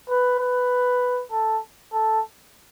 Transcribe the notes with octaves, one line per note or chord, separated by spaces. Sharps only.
B4
B4
A4
A4